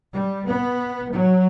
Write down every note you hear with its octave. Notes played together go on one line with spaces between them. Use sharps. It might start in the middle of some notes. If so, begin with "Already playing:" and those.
G3
B3
F#3